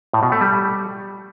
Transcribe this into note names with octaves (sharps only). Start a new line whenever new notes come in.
A2
B2
A3
G3